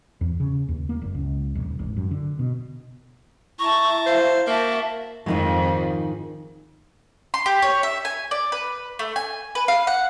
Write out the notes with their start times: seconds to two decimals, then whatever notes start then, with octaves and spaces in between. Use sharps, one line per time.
0.21 E2
0.40 C#3
0.69 D#2
0.89 A#3
1.02 F#1
1.15 C#2
1.55 D#1
1.79 G#1
1.97 F#2
2.11 D3
2.39 B2
3.59 E4 A5 A#5 C#6
4.06 C5 F5
4.47 A#3 F#4 E5 A5
5.26 F2 G#2 D#3 F3 G#3
7.34 C6
7.46 G4
7.62 C#5
7.83 E5
8.05 G#5
8.31 D5
8.52 B4
8.99 A3
9.16 G#5
9.55 B4
9.68 F5
9.87 F#5